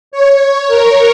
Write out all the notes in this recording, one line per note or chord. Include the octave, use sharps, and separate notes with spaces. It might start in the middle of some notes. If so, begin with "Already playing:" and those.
C#5
A#4